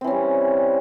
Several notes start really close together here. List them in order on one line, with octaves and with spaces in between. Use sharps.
C4 E3 C#4 G3